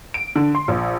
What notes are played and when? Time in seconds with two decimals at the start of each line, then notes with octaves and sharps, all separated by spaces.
0.14 D7
0.36 D3
0.55 C6
0.68 A#1